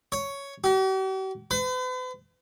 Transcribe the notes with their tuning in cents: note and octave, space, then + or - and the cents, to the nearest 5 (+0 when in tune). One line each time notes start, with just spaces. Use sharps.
C#5 +5
G4 -45
B4 +45